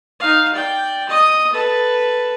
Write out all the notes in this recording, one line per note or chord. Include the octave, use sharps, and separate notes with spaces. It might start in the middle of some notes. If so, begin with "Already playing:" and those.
D#4 F5
D5 G5
D#5 D#6
A4 B4